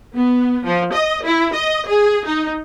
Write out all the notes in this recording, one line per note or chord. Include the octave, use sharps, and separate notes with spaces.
B3
F3
D#5
E4
D#5
G#4
D#4